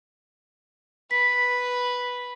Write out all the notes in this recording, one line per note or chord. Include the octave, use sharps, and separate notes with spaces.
B4 B6